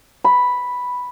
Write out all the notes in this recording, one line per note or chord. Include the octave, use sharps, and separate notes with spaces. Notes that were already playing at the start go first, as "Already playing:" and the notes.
B5